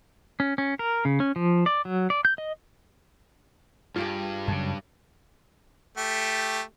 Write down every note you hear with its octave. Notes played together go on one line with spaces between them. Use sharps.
C#4
C#4
A#4
C#3
C#4
F3
D5
F#3
D5
G6
D#5
G2 F4 G4 G#4
F#2 C#3 A5
A3 G4